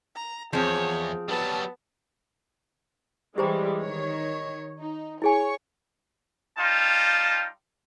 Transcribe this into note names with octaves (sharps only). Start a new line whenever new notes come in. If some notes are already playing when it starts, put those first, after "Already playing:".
A#5
E2 F3 C4 G#4 C#5
F#3 G3 B3 A5
E3 G3 G#3 G4 C5 A#5
D#3 C#5
D#4
E4 G#4 C#5 G#5 C#6
G3 D#4 F4 G5 A5